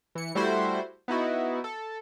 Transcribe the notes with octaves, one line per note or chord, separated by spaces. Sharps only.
E3 C#7
G3 A3 E4 F#4 C5
B3 D#4 E4 F#4
A4